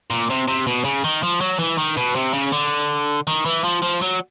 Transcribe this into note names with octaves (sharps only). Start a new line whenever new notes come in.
A#2
C3
C3
B2
C#3
D#3
F3
F#3
E3
D#3
B2
C3
C#3
D3
D#3
E3
F3
F3
F#3